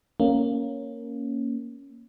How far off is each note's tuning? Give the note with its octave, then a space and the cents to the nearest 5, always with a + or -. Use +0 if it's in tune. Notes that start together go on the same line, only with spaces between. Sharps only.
A#3 +0 C#4 +0